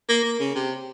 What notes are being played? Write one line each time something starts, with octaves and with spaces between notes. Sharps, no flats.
A#3
A#3
C#3
C3